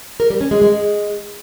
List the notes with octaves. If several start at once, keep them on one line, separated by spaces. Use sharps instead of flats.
A#4
G3
C#4
G#3
G#3